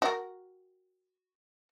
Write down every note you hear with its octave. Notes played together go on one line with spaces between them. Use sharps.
F#4 A#4